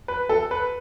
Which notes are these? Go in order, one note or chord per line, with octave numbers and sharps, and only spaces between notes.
B4
A4
B4